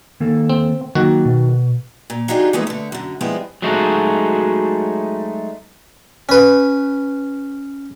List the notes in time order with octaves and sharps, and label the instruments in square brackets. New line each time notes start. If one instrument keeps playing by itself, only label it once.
[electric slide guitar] D#3 A#3 A4
[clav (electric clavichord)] C4
[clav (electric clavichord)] D#3 F#4 [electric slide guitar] F#3 A#3
[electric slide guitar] B2
[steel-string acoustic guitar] A#2
F#3 D4 D#4 F4 G4 G#4
E3 F3 G#3 A3 B3 D#4
D3 A3
F#2 D3
F3 G3 G#3 B3 C4 E4
[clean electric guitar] F#3 G#3 A3 D#4 F#4
[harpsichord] C#4 B4